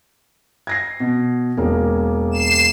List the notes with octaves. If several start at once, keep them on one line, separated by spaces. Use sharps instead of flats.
G#6 A#6 C7
B2
E1 A#3
C7 E7